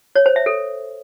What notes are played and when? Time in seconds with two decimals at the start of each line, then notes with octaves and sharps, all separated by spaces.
0.16 C#5
0.26 C5
0.36 E5
0.46 A4